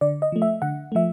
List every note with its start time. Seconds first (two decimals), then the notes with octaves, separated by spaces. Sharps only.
0.01 D3 D5
0.22 D#5
0.32 F3 A3
0.42 E5
0.62 D3 F#5
0.92 F3 A3 E5